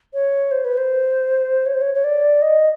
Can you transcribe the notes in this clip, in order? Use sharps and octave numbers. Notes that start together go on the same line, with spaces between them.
C#5
C5
B4
C5
C#5
C5
C#5
C#5
D5
D#5